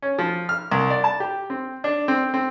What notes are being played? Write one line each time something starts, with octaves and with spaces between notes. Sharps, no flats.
C#4
F3
F6
C2
D5
A5
G4
C4
D4
C4
C4